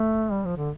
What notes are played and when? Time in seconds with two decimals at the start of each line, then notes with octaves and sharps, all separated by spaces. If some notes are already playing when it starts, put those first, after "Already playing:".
Already playing: A3
0.32 G3
0.45 F3
0.57 D3